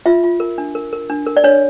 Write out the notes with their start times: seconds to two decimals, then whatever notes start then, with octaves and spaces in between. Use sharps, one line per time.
0.06 F4 E5
0.23 F4
0.40 A#4
0.58 D4
0.75 A#4
0.93 A#4
1.10 D4
1.27 A#4
1.37 D5
1.44 D4 C#5